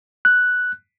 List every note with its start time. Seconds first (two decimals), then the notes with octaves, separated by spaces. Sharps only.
0.25 F#6